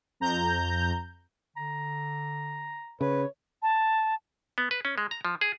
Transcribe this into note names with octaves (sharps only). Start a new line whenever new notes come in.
F2 A#5 G6
D3 A#5
C#3 B4 C#5
A5
B3
B4
C#4
G#3
A#5
F3
G#4